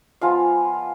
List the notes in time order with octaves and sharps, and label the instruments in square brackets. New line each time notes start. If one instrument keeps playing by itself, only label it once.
[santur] F3 G#3 B3 F4 F5